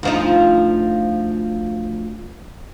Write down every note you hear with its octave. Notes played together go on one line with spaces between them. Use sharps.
D2 F3 D#4